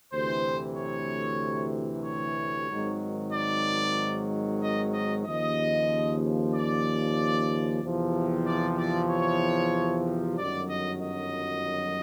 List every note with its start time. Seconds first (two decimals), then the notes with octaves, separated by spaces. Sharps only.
0.13 D2 C3 E3 C5
0.77 C#5
2.05 C#5
2.69 G#1 G#2 D#3 F#3
3.33 D5
4.61 D#5
4.94 D#5
5.26 D#2 C#3 F3 D#5
6.53 D5
7.82 E2 C3 F3
8.47 D5
8.78 D5
9.10 C#5
10.39 G1 F#2 D#3 F#3 D5
10.70 D#5
11.02 D#5